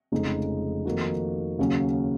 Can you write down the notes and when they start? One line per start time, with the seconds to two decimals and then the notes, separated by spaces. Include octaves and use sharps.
0.12 F1 F2 C#3 G#3 D#4
0.86 F2 D#3 A#3 D#4 F#4
1.59 D#2 C#3 F#3 C#4